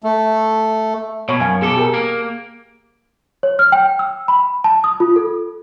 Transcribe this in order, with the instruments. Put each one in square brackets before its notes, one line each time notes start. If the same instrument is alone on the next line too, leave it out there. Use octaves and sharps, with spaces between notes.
[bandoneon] A3
[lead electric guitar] B2 [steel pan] C#5 B5
[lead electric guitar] F#2 [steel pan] F5 G#5
[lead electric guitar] B2 A4 [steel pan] G#4 D6
[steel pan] G4 G#4 A#4
[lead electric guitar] A#3
[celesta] C#5
F6
G5
E6
B5
A5
D#6
F4
A4